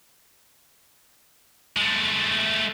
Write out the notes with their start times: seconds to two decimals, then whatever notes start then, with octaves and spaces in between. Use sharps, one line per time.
1.77 G#3 A3